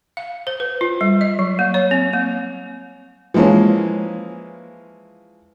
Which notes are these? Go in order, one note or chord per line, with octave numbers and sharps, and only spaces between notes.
F5
C5
B4
F4
G3
D#5
F#3
A#3
C#5
C4
A#3
E3 F3 G#3 A#3 C#4